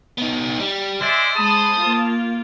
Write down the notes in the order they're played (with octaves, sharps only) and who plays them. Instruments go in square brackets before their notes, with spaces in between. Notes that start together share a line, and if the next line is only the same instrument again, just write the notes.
[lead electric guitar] B3 D#4
G3
[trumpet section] G#3 D5 E5 [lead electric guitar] C5
[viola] G#3 B5 [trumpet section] A5 D#6
[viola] A#3 F4